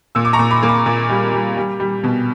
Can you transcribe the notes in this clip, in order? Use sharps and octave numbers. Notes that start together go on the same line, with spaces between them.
A#2 E6
D6
A#5 C#6
A#2
B5 D6
A#3
B5 D6
A#2
G3
G3
G3
G3
B2